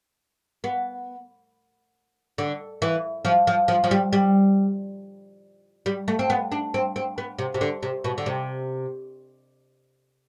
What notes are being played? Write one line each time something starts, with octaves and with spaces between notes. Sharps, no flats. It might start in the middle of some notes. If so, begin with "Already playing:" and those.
B3
D3
E3
F3
F3
F3
F3
G3
G3
G3
A3
C4
B3
D4
C4
C4
B3
C3
C3
D3
C3
B2
D3
C3